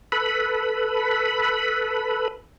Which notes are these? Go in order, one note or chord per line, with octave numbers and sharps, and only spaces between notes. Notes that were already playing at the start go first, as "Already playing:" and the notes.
A4 B4 B5